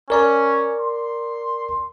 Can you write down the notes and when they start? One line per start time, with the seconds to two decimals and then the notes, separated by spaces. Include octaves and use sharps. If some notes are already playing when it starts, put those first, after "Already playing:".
0.10 C#4 A#4 D5 A#5
0.80 C6